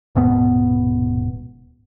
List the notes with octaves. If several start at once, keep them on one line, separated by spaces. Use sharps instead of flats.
D#1 G#2 B2 B3